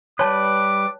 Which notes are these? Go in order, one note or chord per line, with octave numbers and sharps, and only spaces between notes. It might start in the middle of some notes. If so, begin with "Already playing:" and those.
G3 B4 C#5 A5 D6